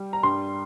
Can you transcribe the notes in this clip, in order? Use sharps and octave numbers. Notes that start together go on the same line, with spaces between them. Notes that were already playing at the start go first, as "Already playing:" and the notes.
Already playing: G3
A#5
G2 G3 C6